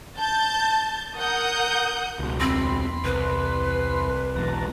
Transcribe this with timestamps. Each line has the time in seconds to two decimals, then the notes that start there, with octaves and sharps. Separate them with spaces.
0.17 A5 G6 A6
1.14 A#4 F#5 D#6 G6
2.19 C#2 B2
2.40 E2 C4 B5 C6
3.04 C2 B4
4.36 B1 E2 A5 A#5